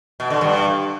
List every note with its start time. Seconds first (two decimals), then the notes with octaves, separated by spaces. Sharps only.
0.20 B2
0.30 D3
0.41 G2